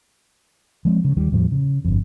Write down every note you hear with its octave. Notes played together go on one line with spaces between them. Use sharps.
F3 G#3 A#3 C4
C#3
D#2 D#3 G3
E2 A2 F3 G3
C#3
G1 F2